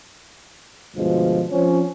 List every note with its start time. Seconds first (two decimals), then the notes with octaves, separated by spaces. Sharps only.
0.96 D2 G2 B2 F3 G#3
1.50 F3 C4 C#4